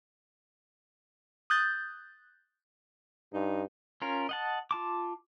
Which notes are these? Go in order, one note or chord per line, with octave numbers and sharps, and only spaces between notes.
D#6 F#6 G6 A6
G2 D#4
C#4 F4 A#4
D#5 F#5 A5
F4 A5 D6